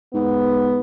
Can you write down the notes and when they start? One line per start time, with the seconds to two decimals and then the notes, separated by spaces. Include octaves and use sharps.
0.14 G#2 B3